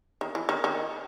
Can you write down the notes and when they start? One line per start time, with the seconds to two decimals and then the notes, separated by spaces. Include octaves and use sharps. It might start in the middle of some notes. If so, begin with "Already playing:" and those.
0.21 D#3
0.35 E3
0.49 D#3
0.64 D#3